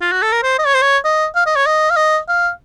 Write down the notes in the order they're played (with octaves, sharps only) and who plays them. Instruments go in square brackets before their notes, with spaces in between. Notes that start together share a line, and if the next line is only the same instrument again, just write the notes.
[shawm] F4
F#4
A4
A#4
C5
D#5
C#5
C5
C#5
D#5
F5
D#5
C#5
D#5
F5
D#5
F5